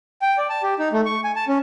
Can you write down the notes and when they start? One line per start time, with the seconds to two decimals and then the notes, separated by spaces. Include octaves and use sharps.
0.22 G5
0.38 D5
0.49 A5
0.63 G4
0.79 D#4
0.93 A3
1.06 C#6
1.24 G#5
1.36 A5
1.48 C#4